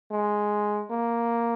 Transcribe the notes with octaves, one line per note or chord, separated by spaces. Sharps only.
G#3
A#3